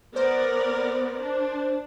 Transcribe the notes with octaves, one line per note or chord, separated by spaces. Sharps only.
B3 A#4 C5 D5
D4